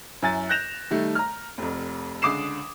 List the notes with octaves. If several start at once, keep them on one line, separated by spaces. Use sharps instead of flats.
F#2 E4 G#5 A6
F#6 G6 A#6 E7 F7
D#3 G3 A3
A#5 F6
F1 F2
C#2 D3 D6 D#6 C7 E7